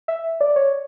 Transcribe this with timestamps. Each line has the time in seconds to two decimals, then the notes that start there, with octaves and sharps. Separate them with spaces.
0.08 E5
0.41 D5
0.56 C#5